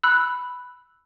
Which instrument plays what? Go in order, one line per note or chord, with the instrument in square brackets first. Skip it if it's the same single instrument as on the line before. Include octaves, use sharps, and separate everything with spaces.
[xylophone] B5 E6 F#6